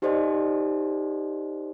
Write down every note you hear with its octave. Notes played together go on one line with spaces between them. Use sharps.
D#4 G4 A4 C5 D5 D#5